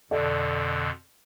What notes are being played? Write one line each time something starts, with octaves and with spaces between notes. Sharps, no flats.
F2 B2 D3 A4 D5